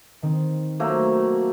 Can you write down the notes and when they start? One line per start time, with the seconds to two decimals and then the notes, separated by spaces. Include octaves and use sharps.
0.23 D#3 C4
0.80 F#3 A3 A#3 C5